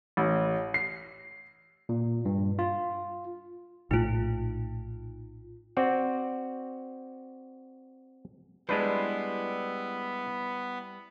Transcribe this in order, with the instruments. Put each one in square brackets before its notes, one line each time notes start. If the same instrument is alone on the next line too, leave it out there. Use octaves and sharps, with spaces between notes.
[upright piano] A1
C7
[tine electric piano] A#2
G2
F4
[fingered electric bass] A#1 A2 A3 [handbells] D#4 F4
[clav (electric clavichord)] C4 F#4 D5
[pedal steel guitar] G3 E4 C5 [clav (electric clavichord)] G#3 D4 B4 [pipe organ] B3